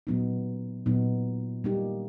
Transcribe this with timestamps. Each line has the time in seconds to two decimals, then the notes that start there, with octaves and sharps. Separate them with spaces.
0.07 A#2 F#3 B3 D#4
0.86 A#2 F#3 B3 D#4
1.64 G3 A#3 D#4 G4